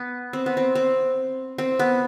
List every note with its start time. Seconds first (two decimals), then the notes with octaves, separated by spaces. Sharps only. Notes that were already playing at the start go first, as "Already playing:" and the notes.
Already playing: B3
0.33 C4
0.46 B3
0.57 C4
0.75 C4
1.58 C4
1.79 B3